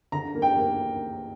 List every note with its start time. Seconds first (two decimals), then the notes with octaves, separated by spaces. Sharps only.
0.12 D3 A#5
0.35 A#3
0.42 G5
0.57 A#3